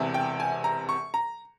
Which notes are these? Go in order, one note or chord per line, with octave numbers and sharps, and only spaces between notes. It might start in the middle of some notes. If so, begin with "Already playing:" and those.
Already playing: E1 E2 C3 E3
G5
G#5
A#5
C#6
A#5